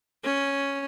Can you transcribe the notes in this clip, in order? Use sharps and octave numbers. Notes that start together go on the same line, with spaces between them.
C#4